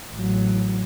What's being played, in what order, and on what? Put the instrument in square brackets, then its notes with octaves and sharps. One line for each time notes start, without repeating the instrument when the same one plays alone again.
[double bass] A1 F#3